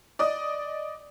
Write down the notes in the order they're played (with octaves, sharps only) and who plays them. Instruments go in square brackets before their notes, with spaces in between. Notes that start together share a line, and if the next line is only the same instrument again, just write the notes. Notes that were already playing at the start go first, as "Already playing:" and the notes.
[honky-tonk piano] D5 D#5 D#6